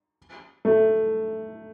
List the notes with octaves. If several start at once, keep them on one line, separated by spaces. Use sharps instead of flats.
A3